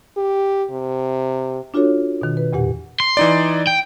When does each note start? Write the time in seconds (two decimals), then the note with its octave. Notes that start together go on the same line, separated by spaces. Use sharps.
0.17 G4
0.71 C3
1.74 D4 F4 F#4 A4 C#5
2.21 B2 D#3
2.37 B4
2.53 E2 A#2 G4 F#5
3.00 C6
3.17 E3 D#4 D5
3.67 G5